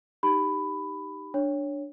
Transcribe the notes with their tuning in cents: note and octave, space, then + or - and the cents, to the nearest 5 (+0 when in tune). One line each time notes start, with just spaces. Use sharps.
D#4 +0 G4 +0 B5 +10
D4 +0 C#5 +0